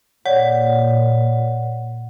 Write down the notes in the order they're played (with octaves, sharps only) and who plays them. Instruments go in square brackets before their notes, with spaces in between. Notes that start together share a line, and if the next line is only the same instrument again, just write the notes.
[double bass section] A#2 [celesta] C#5 D5 [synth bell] F#5